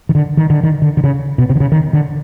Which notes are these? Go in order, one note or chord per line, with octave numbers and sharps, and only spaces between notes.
D#3
D3
D#3
D3
D#3
D3
D3
C#3
B2
C3
D3
C#3
D#3
D3